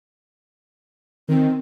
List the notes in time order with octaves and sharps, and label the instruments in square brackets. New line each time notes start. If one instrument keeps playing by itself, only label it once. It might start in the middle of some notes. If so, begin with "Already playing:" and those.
[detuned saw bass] D#3 [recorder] C4